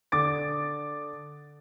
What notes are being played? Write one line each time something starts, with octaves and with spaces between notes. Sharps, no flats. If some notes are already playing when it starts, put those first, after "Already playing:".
D3 D6 D#6 A6 D7